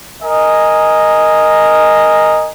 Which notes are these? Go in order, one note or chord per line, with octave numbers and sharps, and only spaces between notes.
A#4 D#5 G#5